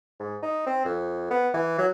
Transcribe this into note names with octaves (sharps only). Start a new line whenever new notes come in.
G#2
D#4
C4
F2
B3
E3
F#3